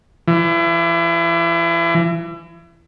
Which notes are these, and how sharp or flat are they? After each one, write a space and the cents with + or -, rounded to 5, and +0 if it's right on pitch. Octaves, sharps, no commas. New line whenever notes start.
E3 +35